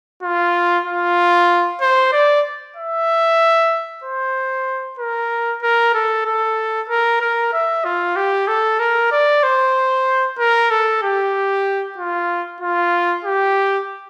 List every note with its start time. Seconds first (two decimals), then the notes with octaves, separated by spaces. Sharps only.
0.23 F4
0.86 F4
1.81 C5
2.13 D5
2.77 E5
4.04 C5
4.99 A#4
5.62 A#4
5.94 A4
6.26 A4
6.89 A#4
7.21 A#4
7.53 E5
7.84 F4
8.16 G4
8.48 A4
8.80 A#4
9.12 D5
9.43 C5
10.39 A#4
10.71 A4
11.03 G4
11.98 F4
12.61 F4
13.24 G4